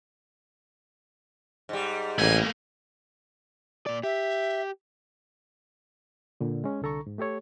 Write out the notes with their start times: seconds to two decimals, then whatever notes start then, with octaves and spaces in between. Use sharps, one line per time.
1.69 G#2 G3
2.18 A1 A3 A#3 G#5
3.86 A#2 D5
4.03 G4 E5
6.41 A#2 D3
6.64 G#3 C#4
6.82 C2 D3 A4 A#5 C#6
7.07 G#2
7.18 A3 G4 A4 C#5